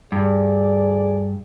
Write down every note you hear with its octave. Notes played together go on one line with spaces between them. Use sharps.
D2 G2 G#4 D5